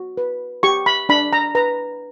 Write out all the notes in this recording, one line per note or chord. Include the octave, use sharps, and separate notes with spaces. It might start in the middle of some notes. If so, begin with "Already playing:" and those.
Already playing: F#4
B4
G4 C#6
B5
D4 B5
A#5
B4 A#5